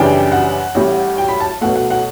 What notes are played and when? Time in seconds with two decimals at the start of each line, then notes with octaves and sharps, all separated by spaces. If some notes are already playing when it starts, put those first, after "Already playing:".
Already playing: F#2 C#3 E3 G3 D4 G5
0.32 F#5
0.75 A1 A2 G3
1.18 G5
1.28 B5
1.40 A5
1.61 B1 B2 A3 F#5
1.76 F#5
1.90 F#5